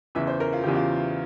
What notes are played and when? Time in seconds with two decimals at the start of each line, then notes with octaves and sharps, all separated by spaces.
0.15 E2 C#3 E3 E5
0.27 C5
0.40 A#4
0.53 F4
0.64 E2 C#3 E3 G4
0.76 F4